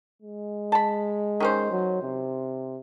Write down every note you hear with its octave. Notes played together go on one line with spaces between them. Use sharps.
G#3
A5 B5
D#3 C#4 C5
F#3
C3